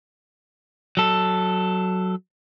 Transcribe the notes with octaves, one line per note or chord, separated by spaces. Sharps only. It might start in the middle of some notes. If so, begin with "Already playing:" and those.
F#3 A4